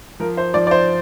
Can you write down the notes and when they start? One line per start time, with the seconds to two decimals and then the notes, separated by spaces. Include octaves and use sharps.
0.20 F3 A#4
0.37 C5
0.54 F3 D5
0.67 D5
0.71 C5